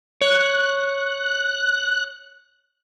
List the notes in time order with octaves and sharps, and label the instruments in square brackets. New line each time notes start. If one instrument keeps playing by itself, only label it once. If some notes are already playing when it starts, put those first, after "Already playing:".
[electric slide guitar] C#5 [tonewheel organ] F#6